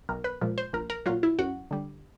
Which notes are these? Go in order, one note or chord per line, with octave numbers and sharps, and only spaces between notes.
B1 A#4
B4
A#2 F3 G#3
C5
A#1 A#4
A#4
A#2 F#3 F4
E4
F#2 F#4
D3 G3